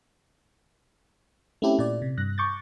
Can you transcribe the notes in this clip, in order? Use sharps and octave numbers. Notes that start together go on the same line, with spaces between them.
A3 C4 C#4 E4 G4 A4
A#2 D5
C3
G2 F#6 A#6
C#6 D6 G6 A6